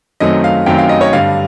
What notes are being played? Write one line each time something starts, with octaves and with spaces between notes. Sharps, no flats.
F#2 D#3 F#3 A3 C4 D#5
F5
F#2 D#3 F#3 A3 C4 G5
F5
D#5
C#5
G2 D3 G3 F5